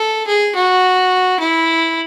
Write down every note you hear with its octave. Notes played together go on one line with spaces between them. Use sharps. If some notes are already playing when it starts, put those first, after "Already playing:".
Already playing: A4
G#4
F#4
E4